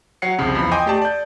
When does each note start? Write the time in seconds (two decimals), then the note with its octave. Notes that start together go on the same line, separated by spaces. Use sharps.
0.22 F#3 C#5 F#5 C7 C#7
0.38 C2 F2 C#3
0.55 E2 F3 B5
0.71 D#5 G5 G#5 C6 D6 D#6
0.86 A3 G4 D5 A5
1.02 D5 G6